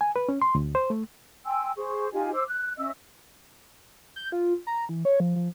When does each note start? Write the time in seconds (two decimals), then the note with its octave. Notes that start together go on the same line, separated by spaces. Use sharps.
0.01 G#5
0.16 B4
0.29 C#4
0.42 C6
0.55 D2
0.75 C5
0.90 A3
1.45 G5 G#5 C6 E6
1.76 G#4 C5 C#6
2.12 D#4 F4 G4 G#5
2.33 C5 D6 E6
2.47 F#6
2.78 C#4 D#5 E5 E6
4.16 G6
4.32 F4
4.67 A#5
4.89 E3
5.05 C#5
5.20 F3
5.36 F3